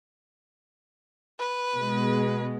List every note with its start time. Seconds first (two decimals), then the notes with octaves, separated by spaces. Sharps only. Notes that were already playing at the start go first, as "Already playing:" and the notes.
1.39 B4
1.75 B2 G#3